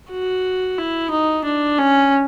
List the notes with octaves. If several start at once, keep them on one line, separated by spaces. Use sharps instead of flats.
F#4
E4
D#4
D4
C#4